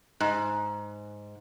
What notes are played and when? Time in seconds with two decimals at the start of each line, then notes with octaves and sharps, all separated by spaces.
0.20 G#2